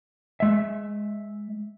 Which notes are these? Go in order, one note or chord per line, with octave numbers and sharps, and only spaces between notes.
G#3 E5